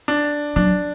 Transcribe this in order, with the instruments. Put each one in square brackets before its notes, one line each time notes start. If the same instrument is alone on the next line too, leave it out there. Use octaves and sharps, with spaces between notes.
[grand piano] D4
[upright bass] F#3 [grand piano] D4